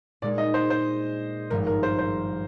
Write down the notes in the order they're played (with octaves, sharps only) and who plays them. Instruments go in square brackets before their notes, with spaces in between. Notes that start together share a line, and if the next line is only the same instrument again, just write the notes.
[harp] A#2 G#3 D#4 [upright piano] D5
[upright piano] D#5
C5
C5
[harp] G#1 G2 F3 [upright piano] A#4
[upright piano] A#4
C5
C5